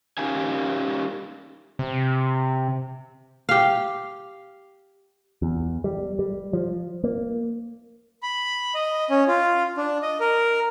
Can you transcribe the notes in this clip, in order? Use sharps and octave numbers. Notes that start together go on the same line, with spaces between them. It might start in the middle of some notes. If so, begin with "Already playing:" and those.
C#4 D#4 G4 A#4 F5 G#5
C3
G4 F5
E2
G3
G3
F3
A#3
B5
D#5
C#4
F4
D4
D#5
A#4